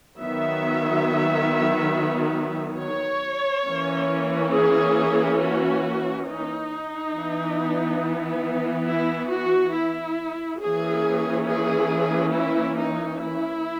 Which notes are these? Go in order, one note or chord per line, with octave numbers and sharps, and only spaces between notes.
D#3 F#3 B3 E5
C#5
E3 A#3 C#4
G#4
F#4
D#4
E3 B3
E4
F#4
E4
E3 A#3 C#4 G#4
G#4
E4
D#4
E4